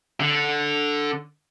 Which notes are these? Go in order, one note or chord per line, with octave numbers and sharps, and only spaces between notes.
D3